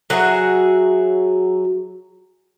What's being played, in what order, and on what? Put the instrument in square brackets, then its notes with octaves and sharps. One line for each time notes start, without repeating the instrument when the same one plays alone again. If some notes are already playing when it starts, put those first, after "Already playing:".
[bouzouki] F#3 F#4 G#4 E5